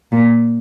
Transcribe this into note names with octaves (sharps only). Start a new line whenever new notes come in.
A#2